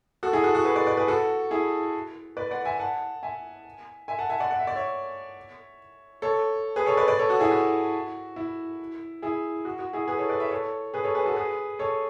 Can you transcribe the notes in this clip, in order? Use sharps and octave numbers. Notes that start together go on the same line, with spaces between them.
F#4 A4
E4 G#4
F#4 A4
F#4
G#4 B4
B4 D5
B4 D5
G#4 B4
F#4 A4
E4 G#4
B4 D5
D5 F#5
E5 G#5
F#5 A5
E5 G#5
E5 G#5
F#5 A5
E5 G#5
D5 F#5
F#5
E5
D5
C#5 E5
A4 C#5
G#4 B4
A4 C#5
B4 D5
B4 D5
A4 C#5
F#4 A4
E4 G#4
F#4
E4
E4 G#4
F#4
F#4
E4 G#4
G#4 B4
A4 C#5
B4 D5
C#5 E5
A4 C#5
G#4 B4
A4 C#5
G#4 B4
F#4 A4
G#4 B4
A4 C#5